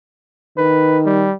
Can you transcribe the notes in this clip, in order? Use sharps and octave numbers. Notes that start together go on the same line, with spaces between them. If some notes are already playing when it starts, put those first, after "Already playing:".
D#3 B4
G3